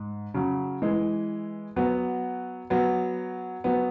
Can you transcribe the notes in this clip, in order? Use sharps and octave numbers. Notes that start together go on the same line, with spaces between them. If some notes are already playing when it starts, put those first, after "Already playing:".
Already playing: G#2
C#3 F#3
E3 G#3
F#3 B3
F#3 B3
F#3 B3